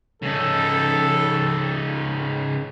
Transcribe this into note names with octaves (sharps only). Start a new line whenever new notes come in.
C#3 D#4 A4